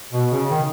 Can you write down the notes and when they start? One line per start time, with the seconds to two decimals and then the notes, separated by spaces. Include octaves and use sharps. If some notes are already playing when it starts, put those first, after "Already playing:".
0.12 B2
0.31 C#3
0.50 D#3